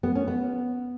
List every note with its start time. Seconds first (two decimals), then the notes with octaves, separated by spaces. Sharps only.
0.03 B3
0.15 C#4
0.27 B3